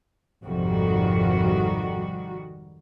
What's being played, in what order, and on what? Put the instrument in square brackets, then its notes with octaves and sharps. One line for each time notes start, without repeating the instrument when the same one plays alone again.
[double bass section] G#1 F2 C3 [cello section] D#3 G3 F#4